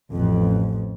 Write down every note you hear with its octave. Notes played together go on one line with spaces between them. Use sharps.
A1 F2